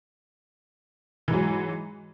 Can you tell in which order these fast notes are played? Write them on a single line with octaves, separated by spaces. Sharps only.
E3 G#2 F#3